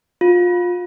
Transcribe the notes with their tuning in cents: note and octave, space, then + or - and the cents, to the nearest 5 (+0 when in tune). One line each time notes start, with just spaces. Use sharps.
F4 +25